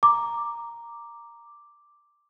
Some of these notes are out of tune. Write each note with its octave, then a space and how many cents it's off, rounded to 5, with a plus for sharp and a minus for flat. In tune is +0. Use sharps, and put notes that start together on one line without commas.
A#5 +0 D6 +0